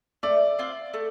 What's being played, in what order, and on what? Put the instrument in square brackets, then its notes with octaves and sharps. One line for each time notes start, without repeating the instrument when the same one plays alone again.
[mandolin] A3 [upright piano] D5
[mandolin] C4 F4
A3